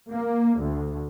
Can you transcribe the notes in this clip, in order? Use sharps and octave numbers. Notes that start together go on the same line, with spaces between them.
A#3
D2